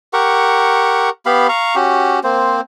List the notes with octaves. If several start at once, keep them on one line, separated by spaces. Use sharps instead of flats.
G4 A#4 F#5 C#6
B3 G4 F5 B5
F5 A#5 C#6
C#4 F#4 G4
A#3 C4 C5